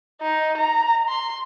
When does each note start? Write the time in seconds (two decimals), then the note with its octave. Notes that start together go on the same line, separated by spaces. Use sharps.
0.22 D#4
0.57 A#5
1.08 C6